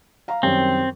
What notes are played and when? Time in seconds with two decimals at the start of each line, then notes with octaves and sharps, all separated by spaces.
0.28 F5 A#5
0.43 F#2 D#3 G3 C4